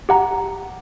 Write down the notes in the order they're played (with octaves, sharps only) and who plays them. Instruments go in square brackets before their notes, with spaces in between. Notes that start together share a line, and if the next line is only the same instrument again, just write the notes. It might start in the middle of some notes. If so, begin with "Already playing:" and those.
[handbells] G4 F#5 A#5